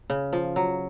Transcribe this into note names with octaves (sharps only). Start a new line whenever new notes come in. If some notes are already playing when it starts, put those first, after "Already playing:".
C#3
F3
F#3